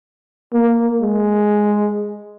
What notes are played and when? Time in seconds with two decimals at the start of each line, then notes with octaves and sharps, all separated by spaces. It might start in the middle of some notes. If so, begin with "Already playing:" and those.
0.53 A#3
1.02 G#3